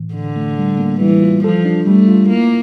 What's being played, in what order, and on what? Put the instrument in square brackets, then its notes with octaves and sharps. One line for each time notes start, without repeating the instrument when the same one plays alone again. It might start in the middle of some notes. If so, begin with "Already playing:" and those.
Already playing: [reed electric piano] A2 E3
[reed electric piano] A2 [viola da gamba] D3
[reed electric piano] A3
G3
A#3
[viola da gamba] E3 [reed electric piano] G3
[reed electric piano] F4
[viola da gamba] F3 [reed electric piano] A4
[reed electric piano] D4
[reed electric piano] G3 [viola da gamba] A3
[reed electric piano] F4
[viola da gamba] A#3 [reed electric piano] E4